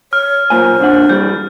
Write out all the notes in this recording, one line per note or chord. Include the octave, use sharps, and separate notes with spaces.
C#5 F6
B1 A#2 C5 G#5
A#2 D4 F#5
G2 E3 G3 G6